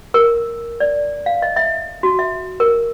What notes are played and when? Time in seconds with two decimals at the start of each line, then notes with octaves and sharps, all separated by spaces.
0.14 A#4
0.80 D5
1.26 F5
1.42 D#5
1.56 E5
2.03 F#4
2.19 E5
2.60 A#4